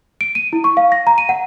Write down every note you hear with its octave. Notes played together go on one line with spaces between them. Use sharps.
D7
D#7
E4
C#6
F5
A#6
A#5
D#7
F#5